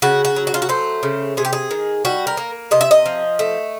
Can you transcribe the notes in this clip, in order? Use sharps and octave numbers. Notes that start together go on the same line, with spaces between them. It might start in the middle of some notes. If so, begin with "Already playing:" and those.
C#3 F#4
F#4
F#3
F#4
F4
F#4
A3 C5
C#3
C3 G#4
G4
G#4
D#3
G3 F#4
A#4
A#3
C3 D#5
E5
D#5
F3
A3